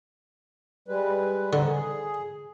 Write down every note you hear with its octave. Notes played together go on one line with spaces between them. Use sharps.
G3 G#3 B4
D3 G#3 C4 D#4
G#4